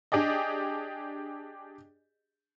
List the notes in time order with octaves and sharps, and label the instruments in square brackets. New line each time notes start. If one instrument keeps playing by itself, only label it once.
[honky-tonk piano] D4 G4 G#4 D5 D#5